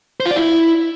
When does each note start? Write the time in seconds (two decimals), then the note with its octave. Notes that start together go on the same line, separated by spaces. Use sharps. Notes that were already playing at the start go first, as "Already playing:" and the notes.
0.20 C5
0.26 F4
0.31 D5
0.36 E4